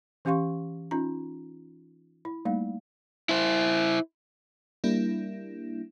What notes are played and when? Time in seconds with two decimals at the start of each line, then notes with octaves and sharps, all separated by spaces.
0.25 E3 C#4 G4 F5 C6 C#6
0.91 C#4 D#4 F4 A#5
2.25 E4
2.45 G3 A3 A#3 D#4 F5
3.29 E4 C5
4.84 G3 A#3 D4 E4